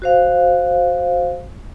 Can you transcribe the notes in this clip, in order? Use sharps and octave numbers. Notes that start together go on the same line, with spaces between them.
F#4 C5 F5